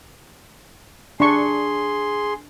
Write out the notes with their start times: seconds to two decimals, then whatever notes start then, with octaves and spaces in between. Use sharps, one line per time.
1.20 D4 G#4 C6 C#6